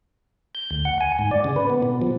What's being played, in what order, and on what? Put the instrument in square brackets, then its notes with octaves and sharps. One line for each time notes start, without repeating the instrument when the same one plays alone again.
[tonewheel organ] G6
D2
F#5
G#5
G#2
D5
C#3
B4
B3
B2
F3